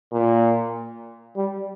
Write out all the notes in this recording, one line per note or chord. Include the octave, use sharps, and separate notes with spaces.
A#2
G3